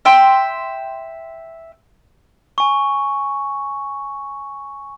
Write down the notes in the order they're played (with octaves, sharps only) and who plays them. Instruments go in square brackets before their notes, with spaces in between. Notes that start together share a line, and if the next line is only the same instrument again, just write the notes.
[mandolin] E5 G5 C6
[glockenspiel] G#5 C#6